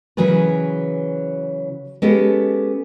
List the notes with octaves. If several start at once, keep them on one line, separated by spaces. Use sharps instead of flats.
C#3 E3 F#3 G#4 A#4 B4
G#3 B3 C#4 G4 A4